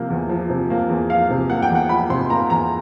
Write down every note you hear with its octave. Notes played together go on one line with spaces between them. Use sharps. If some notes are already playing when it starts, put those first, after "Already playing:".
Already playing: C3 F3 A#3
E2
F3
C3
A#3
E2
F3 F5
C3
A#3 F#5
G5
E2
F#5
F3 B5
C3 C6
A#3 A#5
E2 A#5